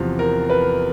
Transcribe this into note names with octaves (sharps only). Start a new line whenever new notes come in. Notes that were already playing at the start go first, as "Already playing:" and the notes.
Already playing: E2 C3 F3
A#4
B4